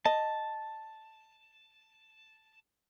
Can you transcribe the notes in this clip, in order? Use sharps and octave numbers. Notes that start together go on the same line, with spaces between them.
D#5 A5